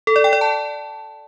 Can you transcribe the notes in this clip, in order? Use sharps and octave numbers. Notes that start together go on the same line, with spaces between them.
A4
D5
G5
D5
A5